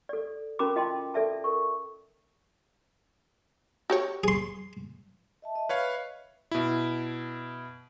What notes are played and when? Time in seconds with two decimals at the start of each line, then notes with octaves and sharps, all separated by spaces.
0.09 A4 D5
0.59 C#4 F#4 A#4 A#5 B5 D6
0.76 F4 D#5 G5 A5 C6
1.14 A4 D5 E5 A5
1.44 A#4 C#6
3.90 F#4 G4 C#5
4.24 G#4 C6
5.42 D#5 E5 A5
5.55 D#5 E5
5.69 B4 C#5 F5
6.51 B2 E4